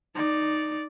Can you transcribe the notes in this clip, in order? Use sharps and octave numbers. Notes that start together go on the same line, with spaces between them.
D#4 D5